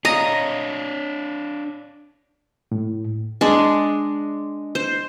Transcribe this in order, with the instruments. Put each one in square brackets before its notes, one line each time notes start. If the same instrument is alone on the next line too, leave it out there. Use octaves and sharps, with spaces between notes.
[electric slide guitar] D4 C#5 F5 [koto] D#5 [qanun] A#5
[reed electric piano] A2
[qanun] G#3 D4
C5